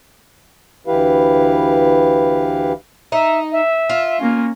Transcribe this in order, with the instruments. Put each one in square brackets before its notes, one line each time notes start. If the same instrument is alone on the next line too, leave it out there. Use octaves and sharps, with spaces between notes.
[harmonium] D2 E3 E4 G4 B4 F5
[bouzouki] D#4 [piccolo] E5
[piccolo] E5
[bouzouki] F4
[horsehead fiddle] A#3 C#4